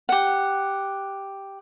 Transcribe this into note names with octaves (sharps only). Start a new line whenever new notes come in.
G4 F#5